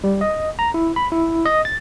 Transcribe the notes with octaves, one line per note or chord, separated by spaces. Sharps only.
G3
D#5
A#5
E4
B5
E4
D#5
A6